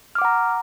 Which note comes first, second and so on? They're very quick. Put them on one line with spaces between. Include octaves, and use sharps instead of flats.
F6 D6 F#5 A#5